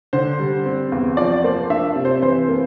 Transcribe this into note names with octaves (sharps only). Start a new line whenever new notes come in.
D3 C5
G3
C4
E2
F3 D5
A#3 C5
D4 E5
C3
C5
E3 C5
A#3